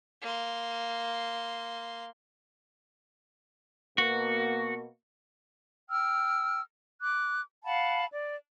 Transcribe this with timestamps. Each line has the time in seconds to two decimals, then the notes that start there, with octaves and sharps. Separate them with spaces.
0.22 A#3 C6
3.98 B2 A#3 F#4
5.90 G5 E6 F6
7.01 D6 F#6
7.65 F5 F#5 A5 B5
8.11 D5